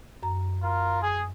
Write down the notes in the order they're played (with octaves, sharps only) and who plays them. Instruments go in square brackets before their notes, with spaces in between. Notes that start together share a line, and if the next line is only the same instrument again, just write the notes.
[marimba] F#2 A#5
[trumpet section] F4 A#4
G#4